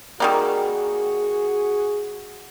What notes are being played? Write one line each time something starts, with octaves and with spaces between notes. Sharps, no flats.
D#3 G3 A#3 F#4 G#4